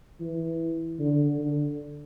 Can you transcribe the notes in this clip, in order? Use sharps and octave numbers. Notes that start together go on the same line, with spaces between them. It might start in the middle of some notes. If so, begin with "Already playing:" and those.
E3
D3
D3